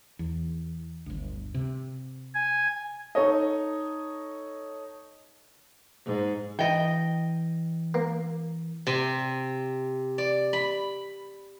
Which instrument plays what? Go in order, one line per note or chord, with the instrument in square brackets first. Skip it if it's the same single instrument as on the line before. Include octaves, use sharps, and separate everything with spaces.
[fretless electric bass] E2
G1 D2
C3
[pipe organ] G#5
[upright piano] D#4 A4 C#5 D#5
[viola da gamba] G#2
[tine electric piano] E3 [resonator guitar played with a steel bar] D#5 G5
[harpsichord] A#3
[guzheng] C3
D5
B5